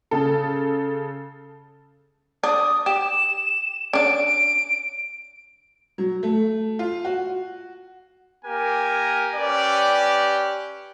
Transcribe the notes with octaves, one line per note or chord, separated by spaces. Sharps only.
C#3 A4
D4 D#6
G4 E7
C#4 D4 D7
F#3
A3
F4
F#4
A#3 G4 A#4 G#5
C#4 G4 B4 D5